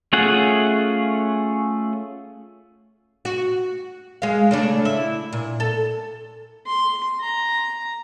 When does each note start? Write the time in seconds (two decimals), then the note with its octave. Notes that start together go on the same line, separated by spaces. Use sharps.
0.13 A3 C#4 F4 G#4 F#5
3.25 F#4
4.22 G#3 F5
4.51 C#3 A3 D4
4.85 E4
5.33 A#2
5.60 A4
6.66 C6
7.21 A#5